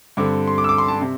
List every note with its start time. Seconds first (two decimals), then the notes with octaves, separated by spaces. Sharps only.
0.17 G2 D3 C4 D6
0.47 C6
0.58 D6
0.64 E6
0.69 D6
0.78 C6
0.88 A5
1.01 C3